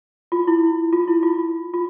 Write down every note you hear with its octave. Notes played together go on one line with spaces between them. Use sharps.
F4
E4
F4
E4
F4
F4